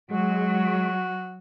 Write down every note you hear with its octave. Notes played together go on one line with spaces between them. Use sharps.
F#3 G#3 F#4